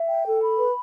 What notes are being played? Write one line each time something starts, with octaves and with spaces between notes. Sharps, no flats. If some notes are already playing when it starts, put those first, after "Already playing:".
Already playing: E5
G5
A4
B5
B4